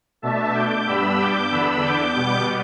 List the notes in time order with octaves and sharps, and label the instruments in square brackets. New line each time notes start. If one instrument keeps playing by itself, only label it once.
[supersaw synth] B2 A3 D4 E5 A5
D6 G6
G2 G3 B3 D4 B5 E6
D6 G6
E2 D3 B3 D4 B5 E6
D6 G6
B2 G3 B3